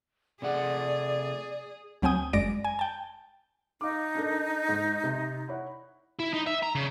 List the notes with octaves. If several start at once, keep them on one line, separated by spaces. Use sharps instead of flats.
C3 A3 G#4 D5 F#5
D2 F#3 C4 G5 G#5 D#6
G1 F#2 G#3 D5 A#6 D7
G#5
G5 A5
D#4 F5 D6
D4 A4 A#4
G#2
C3
E4 C#5 F#5
E4
D#4
E5
A#5
C#3